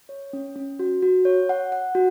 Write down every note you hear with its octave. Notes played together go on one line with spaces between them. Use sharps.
C#5
C#4
C#4
F#4
F#4
C#5
F#5
F#5
F#4